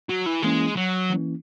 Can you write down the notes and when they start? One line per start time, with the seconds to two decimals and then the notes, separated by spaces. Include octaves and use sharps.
0.09 F#3
0.26 E3
0.43 E3 G#3 A#3 C#4 E4
0.76 F#3
1.10 E3 A#3 C#4 E4